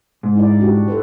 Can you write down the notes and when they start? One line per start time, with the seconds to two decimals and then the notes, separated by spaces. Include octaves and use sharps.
0.23 G#2
0.35 D#4 E4 D5
0.59 D4 F#4 G4
0.88 A4 B4 C5